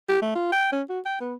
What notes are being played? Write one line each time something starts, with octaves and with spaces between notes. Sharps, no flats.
G4
A3
F4
G5
C#4
F#4
G5
B3